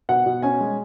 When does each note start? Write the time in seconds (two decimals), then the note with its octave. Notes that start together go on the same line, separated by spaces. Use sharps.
0.09 B2 F#5
0.26 B2
0.42 C#4 G#5
0.60 G#3